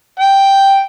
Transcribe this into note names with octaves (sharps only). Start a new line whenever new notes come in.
G5